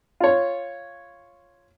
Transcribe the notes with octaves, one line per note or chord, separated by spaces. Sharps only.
F4 C#5